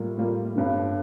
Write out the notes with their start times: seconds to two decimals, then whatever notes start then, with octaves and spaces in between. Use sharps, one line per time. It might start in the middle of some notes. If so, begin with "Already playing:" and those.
Already playing: A2 G3 A#3 F4
0.18 A2 G3 A#3 F4
0.55 G1 G2 D3